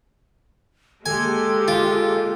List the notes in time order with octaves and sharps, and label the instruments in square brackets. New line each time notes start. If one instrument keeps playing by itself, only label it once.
[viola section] G#3 A#3 G4 [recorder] A4 [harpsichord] G#5
[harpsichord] F4